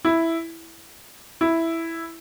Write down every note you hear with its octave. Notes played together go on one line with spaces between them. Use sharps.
E4
E4